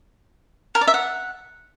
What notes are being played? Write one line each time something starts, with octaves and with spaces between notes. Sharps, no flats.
A#4
D5
E5
F#5